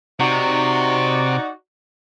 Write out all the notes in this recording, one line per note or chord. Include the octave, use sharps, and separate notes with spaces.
C3 D#4 F#4 D5